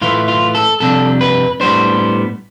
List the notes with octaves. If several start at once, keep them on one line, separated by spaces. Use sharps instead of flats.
A2 E3 A3 E4 F4
F4
A4
F2 C3 G3 D4 A4
B4
A2 G3 B3 D4 C5